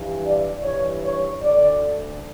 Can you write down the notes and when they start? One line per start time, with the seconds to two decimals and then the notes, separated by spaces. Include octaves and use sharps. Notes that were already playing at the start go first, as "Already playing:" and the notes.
Already playing: G2 E3
0.23 D5
0.63 G2 E3 C#5
1.03 C#5
1.42 D2 D3 D5